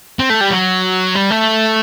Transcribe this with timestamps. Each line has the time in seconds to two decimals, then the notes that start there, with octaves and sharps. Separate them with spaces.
0.19 C4
0.30 A3
0.41 G3
0.51 F#3
1.15 G3
1.31 A3